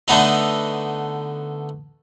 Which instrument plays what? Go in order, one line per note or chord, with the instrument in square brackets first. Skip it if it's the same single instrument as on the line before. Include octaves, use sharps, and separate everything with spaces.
[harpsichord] D3 A3 B3 D#4